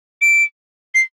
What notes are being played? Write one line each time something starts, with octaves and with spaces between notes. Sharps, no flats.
D7
C7